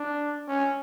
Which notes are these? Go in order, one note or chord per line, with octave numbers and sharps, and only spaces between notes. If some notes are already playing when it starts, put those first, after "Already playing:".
Already playing: D4
C#4